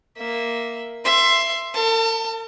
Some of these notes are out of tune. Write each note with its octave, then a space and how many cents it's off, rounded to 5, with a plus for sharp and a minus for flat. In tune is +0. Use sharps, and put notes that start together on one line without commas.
A#3 +0 E5 +0
E5 +20 C6 +5
A#4 -45 A5 +30